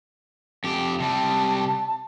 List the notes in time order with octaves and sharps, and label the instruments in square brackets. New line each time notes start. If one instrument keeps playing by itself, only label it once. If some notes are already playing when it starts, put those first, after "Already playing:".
[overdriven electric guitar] F2 G4
[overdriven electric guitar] C3 G3 [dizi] A5